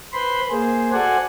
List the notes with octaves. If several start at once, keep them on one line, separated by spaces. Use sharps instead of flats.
B4 C5 B5 C6
A#3 G#4 C5
F#4 A4 C5 D5 F#5 G#5